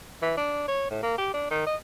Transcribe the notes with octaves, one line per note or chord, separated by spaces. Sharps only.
E3
D4
C#5
A2
A#3
G4
D4
D#3
D#5